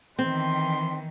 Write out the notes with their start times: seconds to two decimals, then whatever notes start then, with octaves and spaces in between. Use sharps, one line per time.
0.19 D#3 E3 C4 C6